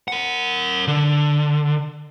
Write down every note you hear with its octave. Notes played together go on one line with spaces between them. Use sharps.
A#4 F#5
D3